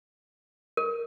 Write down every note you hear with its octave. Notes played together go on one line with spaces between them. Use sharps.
A#4